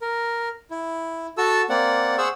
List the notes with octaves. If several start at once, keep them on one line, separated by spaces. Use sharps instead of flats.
A#4
E4
F#4 A4 A5 E6
A#3 C4 D5 F#5
G#4 C5 F#5 C#6 E6